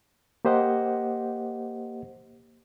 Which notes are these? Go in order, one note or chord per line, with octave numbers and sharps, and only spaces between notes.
A#3 G4 C5 D#5 F#5